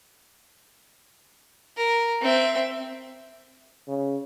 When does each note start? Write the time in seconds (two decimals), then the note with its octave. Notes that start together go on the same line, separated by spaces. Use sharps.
1.77 A#4
2.22 C4 E5
3.88 C#3